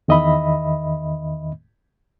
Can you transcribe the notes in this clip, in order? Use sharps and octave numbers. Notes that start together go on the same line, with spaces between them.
E2 D#3 D#5 E5 B5